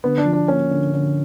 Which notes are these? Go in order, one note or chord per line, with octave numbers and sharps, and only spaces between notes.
D3 B3
D4
F3
D4
A#3 C#4
D3
D3